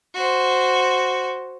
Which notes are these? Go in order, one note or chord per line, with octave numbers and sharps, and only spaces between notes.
F#4 C5